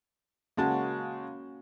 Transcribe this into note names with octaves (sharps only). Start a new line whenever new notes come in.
C#3 G#3 A#3 C#4 F#4 A5